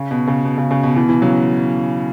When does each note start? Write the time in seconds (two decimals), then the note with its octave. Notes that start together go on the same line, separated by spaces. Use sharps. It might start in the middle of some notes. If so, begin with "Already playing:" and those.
Already playing: C#3
0.11 B2
0.27 C#3
0.45 B2
0.58 C#3
0.71 C#3
0.83 B2
0.96 B2 E3
1.09 B2 E3
1.22 C#3 F#3